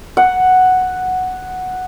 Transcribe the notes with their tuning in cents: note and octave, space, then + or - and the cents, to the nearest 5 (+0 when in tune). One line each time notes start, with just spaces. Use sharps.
F#5 +0